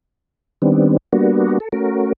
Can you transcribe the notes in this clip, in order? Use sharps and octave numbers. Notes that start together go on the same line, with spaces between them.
D#3 G3 B3 C4 D4
G3 A#3 B3 D4 F#4
A4
A3 C#4 F#4 A#4